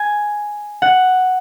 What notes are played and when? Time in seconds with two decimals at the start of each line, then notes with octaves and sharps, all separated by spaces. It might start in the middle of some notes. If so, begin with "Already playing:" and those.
Already playing: G#5
0.82 F#5